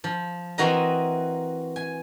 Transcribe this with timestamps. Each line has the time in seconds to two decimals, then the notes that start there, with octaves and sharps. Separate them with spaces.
0.04 F3
0.58 E3 C4 F#4 A#4 D#5 A#5
1.76 G#5